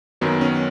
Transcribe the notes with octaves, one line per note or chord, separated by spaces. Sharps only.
F#2 D#3 F#3 B3
C#4